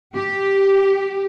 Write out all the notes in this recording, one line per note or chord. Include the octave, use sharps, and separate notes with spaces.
G4